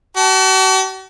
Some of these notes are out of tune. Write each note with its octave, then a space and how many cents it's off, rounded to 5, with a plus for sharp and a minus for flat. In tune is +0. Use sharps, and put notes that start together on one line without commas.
F#4 +45 A5 +0